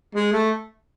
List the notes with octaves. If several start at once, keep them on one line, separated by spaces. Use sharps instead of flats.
G#3
A3